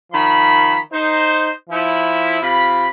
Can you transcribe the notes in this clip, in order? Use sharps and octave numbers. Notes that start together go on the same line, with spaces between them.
D#3 F3 B5
D#4 C5
F3 E4
C3 F4 B5